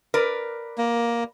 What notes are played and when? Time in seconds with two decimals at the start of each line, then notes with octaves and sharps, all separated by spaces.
0.14 A#4 B4 D5
0.78 A#3